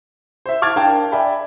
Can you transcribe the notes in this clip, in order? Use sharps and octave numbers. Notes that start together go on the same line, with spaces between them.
C5 E5
A5 D6 F6 G#6 A6
D4 A#4 F5 G5 A5
D5 E5 G5 G#5 B5